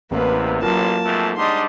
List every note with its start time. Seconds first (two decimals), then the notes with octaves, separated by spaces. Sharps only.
0.11 A1 E2 C3 A#3 B4
0.62 A1 F#3 A#3 F4 A5
1.04 F2 G#2 A3
1.36 G#2 G3 D4 D#5 C6